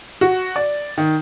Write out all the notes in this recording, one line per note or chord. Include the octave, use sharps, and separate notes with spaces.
F#4
D5
D#3